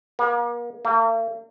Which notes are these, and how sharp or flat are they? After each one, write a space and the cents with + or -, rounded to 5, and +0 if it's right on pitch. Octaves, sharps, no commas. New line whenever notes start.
A#3 +40
A#3 -45